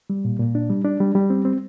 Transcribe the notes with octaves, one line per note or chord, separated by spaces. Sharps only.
G3
A#2
A#2
D4
G3
D4
G3
G3
C4
C4